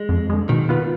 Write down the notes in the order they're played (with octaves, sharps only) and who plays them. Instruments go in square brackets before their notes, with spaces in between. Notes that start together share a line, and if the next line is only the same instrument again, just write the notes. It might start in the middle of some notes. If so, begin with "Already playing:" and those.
Already playing: [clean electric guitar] G#3
[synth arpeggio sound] F2
D3 G#3
[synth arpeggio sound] B2 [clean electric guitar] D#3
[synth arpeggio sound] B3 F4 B4